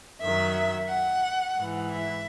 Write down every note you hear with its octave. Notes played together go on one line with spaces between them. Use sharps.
F#2 D#3 F#3 E5
F#5
G#2 E3
E5